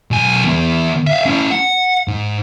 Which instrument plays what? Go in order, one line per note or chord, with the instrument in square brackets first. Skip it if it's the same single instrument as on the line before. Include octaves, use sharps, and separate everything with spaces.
[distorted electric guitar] B1 G#5
E3 B3
E5 F5
C#4 E4
F#5
G#2